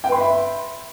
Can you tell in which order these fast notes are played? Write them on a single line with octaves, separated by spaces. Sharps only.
G5 B4 C6 B5 E5